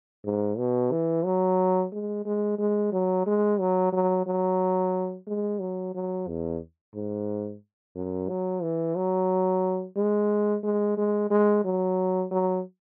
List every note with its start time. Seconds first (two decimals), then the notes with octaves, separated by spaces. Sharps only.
0.25 G#2
0.58 B2
0.92 E3
1.25 F#3
1.92 G#3
2.25 G#3
2.59 G#3
2.93 F#3
3.27 G#3
3.60 F#3
3.93 F#3
4.27 F#3
5.28 G#3
5.61 F#3
5.95 F#3
6.28 E2
6.95 G#2
7.95 F#2
8.29 F#3
8.63 E3
8.96 F#3
9.96 G#3
10.64 G#3
10.97 G#3
11.31 G#3
11.65 F#3
12.31 F#3